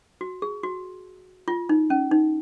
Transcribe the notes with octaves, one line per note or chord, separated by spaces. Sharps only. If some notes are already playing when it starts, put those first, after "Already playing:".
F#4
G#4
F#4
F4
D#4
C#4
D#4